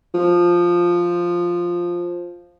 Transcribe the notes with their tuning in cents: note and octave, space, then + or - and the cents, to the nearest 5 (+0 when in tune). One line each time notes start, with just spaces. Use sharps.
F3 +0